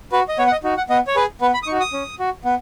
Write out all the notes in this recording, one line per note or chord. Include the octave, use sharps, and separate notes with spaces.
F#4 B4
D#5
B3 C#5
F#5
D#5
D#4 F#4
F#5
B3 D#5
C#5
G#4 B4
B3 B4
B5
D#6
D#4 F#4 C#6
D#6
C#4
F#4
B3